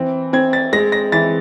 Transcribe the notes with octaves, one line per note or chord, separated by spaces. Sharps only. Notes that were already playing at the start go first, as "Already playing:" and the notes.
Already playing: E3 C4
C4 G#6
A6
G#3 A#6
A#6
E3 A6